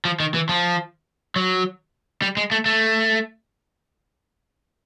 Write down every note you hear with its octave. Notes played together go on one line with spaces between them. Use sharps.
F3
D#3
E3
F3
F#3
G3
G#3
A3
A3